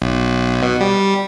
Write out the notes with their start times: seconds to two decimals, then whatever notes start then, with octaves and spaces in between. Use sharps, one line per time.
0.02 B1
0.63 B2
0.81 G3